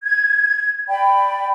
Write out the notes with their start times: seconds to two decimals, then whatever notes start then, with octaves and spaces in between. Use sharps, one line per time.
0.03 G#6
0.88 D5 G5 B5